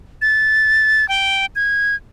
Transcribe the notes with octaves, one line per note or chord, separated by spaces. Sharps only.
A6
G5
G#6